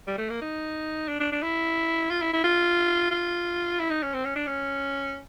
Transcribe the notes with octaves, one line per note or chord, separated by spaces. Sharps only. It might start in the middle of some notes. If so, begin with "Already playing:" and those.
G3
A3
A#3
D#4
D4
D4
D4
E4
F4
E4
E4
F4
F4
E4
D#4
C#4
C4
C#4
D4
C#4